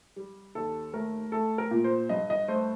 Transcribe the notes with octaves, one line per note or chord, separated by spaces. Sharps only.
G3
D#2 A4
A3 A#4
A3 A4
A#4
A#2
C5
G2 D#5
D#5
A3 C5